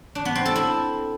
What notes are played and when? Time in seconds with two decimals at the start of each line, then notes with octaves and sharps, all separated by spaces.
0.15 D4
0.25 B3
0.35 C4
0.45 A4
0.56 E4